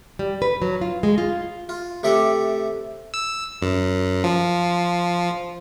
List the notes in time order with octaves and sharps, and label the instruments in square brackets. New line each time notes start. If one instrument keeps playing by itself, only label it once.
[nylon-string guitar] G3
B4
F#3
F4
G#3
F4
[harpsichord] F4
C3 A3 G4 A4 D5
[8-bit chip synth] E6
F#2
F3